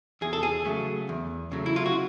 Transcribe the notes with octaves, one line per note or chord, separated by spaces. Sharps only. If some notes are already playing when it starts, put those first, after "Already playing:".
E2 G#4
A4
G#4
C#3 F#3 A3
E2
C#3 F#3 A3
E4
F4
F#4